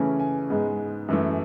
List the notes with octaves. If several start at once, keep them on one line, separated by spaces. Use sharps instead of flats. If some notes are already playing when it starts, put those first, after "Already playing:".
Already playing: C#3 E3 A3 C#4 G#5
G#5
G#2 G#3 B3
F#2 E3 A3